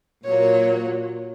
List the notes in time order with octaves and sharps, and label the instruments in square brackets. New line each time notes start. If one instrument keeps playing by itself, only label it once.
[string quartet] A#2 F#3 A#3 C#5